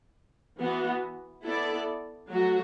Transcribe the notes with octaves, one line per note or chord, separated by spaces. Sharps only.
E3 B3 F#4
B3 E4 A4 D5
F#3 A3 F#4